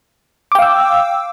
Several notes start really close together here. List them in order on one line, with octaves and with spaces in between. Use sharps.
D6 G5 F5 E6